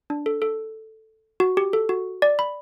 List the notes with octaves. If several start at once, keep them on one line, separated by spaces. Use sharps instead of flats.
D4
A4
A4
F#4
G4
A4
F#4
D5
B5